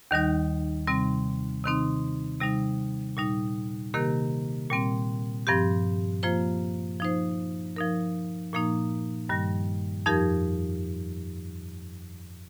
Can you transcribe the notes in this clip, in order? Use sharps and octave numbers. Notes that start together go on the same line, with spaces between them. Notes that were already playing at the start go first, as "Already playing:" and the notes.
D#2 D#3 G3 D#4
C3 G3 C4
C3 D#3 C4 D#4
C3 G3 D#4
A#2 G3 D#4
C3 D#3 A#3 G4 A#4
A#2 G3 C4
G2 F3 C4 G4
F3 A#3 F4 C5
F3 D#4 C5
F3 D#4 A#4
A#2 F3 A#3 D#4
G2 D#3 G3
F2 F3 D#4 G4 A#4